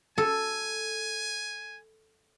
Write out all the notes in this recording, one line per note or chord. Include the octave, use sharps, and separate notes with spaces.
A4 G#5